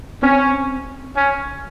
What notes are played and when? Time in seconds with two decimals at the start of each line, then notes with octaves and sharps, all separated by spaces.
0.23 C4 C#4
1.16 C#4